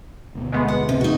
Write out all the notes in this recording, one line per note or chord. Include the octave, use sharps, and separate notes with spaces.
D2 B2
G#3 A3 B3
F#5
C3
D#4 F#4